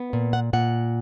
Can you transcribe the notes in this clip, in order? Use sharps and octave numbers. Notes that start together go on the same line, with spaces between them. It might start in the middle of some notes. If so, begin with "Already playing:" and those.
Already playing: B3
A#2
F#5
A#2 F#5